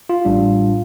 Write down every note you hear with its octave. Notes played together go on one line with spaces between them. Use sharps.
F4
A1 A2 G3 D4